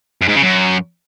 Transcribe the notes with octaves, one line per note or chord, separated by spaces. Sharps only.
F#2
G#2
C#3
F#2